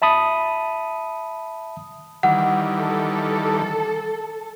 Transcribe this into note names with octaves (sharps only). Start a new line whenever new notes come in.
E5 A5 B5 D#6
D#3 E3 G3 F#5
A4